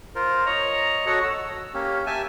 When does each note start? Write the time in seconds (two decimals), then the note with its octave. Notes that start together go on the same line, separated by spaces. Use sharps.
0.15 F4 A#4 C5
0.46 C#5 D#5 A#5
1.06 F#4 A4 C#5 D#5 F#5
1.24 E6
1.74 A#3 C#4 G4
2.06 G4 E5 G#5 A5